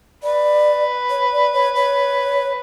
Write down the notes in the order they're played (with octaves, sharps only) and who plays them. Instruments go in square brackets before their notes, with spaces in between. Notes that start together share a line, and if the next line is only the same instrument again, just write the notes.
[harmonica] B4 [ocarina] D5
[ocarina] C#5
D5
C#5
C#5